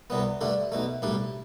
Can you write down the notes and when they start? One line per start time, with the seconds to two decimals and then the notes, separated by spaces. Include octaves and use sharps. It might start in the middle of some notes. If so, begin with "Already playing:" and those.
0.10 C2 C3 G3 B3
0.41 G2 D3 A3 D4
0.72 B1 B2 A3
1.02 B1 A2 G3 D4